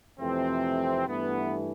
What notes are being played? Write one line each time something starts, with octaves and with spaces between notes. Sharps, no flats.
F2 C3 E3 A3 C4
G2 E3 A3 B3